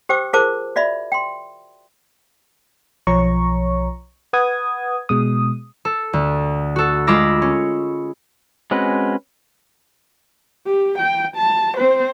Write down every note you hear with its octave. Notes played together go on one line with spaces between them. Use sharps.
G4 C5 G5 D6 E6
F4 G#4 A#4 C5 A5 D6
F#4 D5 E5 B5
G5 C6
B1 F3 C#5 A#5 C#6
B4 F#5 D#6 G#6
B2 G#3 D#6
A4
D2
F#4 A4
G#3 F4 B5 D6 E6 A#6
C#4
G#3 C4 C#4 F#4 B4
G4
G5
A5
C4 C5